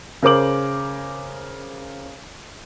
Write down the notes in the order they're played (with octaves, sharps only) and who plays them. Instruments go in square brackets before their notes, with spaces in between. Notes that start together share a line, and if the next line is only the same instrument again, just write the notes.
[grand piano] C#3 A#4 C5 D6 F#7